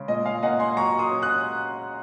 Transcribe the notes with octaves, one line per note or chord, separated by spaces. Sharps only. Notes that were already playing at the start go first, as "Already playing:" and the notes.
Already playing: C#3 G#3
A#2 D#5
F5
A#3 D#5 F#5
G#5 C6
F#3 A#5 C#6
C6 D#6
C#4
D#6 F#6